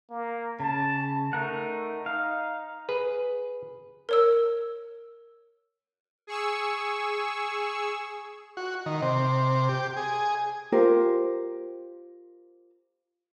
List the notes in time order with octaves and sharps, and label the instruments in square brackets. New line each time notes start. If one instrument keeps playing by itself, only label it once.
[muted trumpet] A#3
[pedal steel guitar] C#3 [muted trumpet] A5
[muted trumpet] A3 [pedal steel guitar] D#4 A#4 F#5
[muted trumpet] D#4 [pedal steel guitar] F5
[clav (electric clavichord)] G#4 B4
[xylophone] A#4 C#5 E6
[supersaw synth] G#4 C#6 E6
[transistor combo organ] F#4
D#3
C3
G4
G#4
[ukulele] F4 G4 A#4 C5